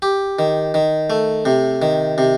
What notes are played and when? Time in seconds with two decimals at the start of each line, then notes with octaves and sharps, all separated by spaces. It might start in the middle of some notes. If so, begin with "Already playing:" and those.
0.02 G4
0.39 D#3
0.74 D#3
1.10 A3
1.45 C3
1.82 D#3
2.18 C3